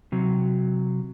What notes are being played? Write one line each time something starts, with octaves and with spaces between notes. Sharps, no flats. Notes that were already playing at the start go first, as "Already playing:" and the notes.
C3 F#3